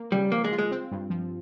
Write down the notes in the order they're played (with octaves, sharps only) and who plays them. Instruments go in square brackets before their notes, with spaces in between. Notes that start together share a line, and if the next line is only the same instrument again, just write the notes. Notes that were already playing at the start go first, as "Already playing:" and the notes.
Already playing: [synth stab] A#3
[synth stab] C#3 [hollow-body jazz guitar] G3
[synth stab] F3 [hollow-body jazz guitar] A#3
[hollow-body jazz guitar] G#3
[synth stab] F4
[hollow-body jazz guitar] G#3
[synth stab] C4
G2
F3